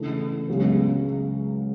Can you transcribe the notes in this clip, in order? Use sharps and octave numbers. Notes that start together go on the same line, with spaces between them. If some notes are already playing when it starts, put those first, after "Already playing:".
Already playing: C#3 E3 A3 D4
C#2 C#3 F#3 B3